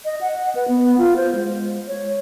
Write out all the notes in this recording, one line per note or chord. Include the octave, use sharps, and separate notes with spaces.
D#5
F#5
B4
B3
F4
C5
G#3
C#5